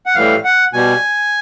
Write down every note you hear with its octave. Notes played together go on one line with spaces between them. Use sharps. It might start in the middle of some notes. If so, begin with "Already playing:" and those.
F#5
A2 E3 G3 F5
F#5
B2 G3 G#5